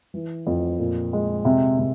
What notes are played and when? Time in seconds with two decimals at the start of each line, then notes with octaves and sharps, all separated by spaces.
0.14 E3
0.47 F2
0.79 A#2
1.13 G#3
1.45 C3
1.79 C3